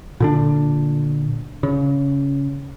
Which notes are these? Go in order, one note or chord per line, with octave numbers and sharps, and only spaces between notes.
A#2 D3 D4
C#3